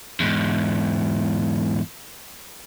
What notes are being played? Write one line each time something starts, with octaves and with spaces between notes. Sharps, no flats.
E2 G#2